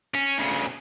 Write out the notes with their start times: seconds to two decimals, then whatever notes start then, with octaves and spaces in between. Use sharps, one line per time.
0.14 C#4
0.38 D2 C#3